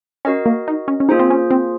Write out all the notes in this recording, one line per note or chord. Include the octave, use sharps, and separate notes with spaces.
C#4 F#4 A#4 D#5
A#3
D#4
C#4
C#4
A#3 D#4 F4 G#4 C5
C4
C#4
C4